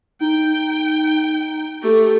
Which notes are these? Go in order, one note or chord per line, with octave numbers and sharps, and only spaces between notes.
D#4 G5
A3 G4